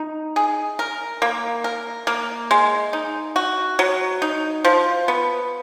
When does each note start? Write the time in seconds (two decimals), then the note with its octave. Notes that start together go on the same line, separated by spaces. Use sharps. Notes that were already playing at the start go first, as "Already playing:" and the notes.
Already playing: D#4
0.36 G#4
0.79 A#4
1.22 A#3
1.64 A#4
2.07 A#3
2.51 G#3
2.93 D#4
3.36 F#4
3.79 F#3
4.22 D#4
4.65 F3
5.08 B3